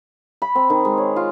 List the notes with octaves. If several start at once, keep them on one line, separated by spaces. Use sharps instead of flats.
B5
C4
D#3
G#3
C#5
F4